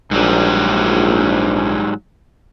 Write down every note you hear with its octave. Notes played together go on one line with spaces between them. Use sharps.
A#1 G#2 F#3 G3